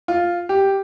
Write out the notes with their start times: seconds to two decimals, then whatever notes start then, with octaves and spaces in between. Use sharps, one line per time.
0.08 F4
0.49 G4